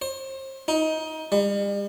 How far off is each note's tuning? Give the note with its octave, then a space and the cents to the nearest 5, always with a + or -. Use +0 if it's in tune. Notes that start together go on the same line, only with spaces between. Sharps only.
C5 +35
D#4 +20
G3 +45